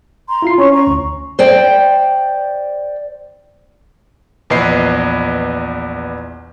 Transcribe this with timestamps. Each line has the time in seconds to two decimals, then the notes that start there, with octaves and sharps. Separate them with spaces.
0.29 A#5 C6
0.42 E4 F4 C7
0.58 C#4 C#5 C#6
0.74 A#5 C#6
0.87 D2
1.39 C5 D5 G5
4.50 A#1 E2 B4 D#5 C7